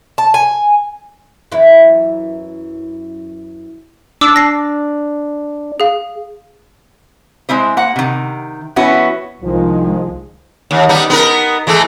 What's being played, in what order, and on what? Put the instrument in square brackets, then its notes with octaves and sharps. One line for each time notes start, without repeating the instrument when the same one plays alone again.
[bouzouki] A5
G#5
[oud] F#2 E3 E4
[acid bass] D4 [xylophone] D6 E6
[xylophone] A#6 C7
G#4 F5
[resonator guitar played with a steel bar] G#3 C4 E4 C5
A#3 F#5
C3 D#3
F3 B3 C#4 E4 F#4
[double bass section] C2 G#3 [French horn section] D#3 F3
[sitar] D#2
G3 B3 D#4
B3 D#4 A#4
E3 G#3 A3